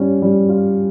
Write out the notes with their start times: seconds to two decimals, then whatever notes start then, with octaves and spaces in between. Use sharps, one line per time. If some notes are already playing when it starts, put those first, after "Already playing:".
Already playing: G3 C#4 F4
0.22 G3
0.49 F4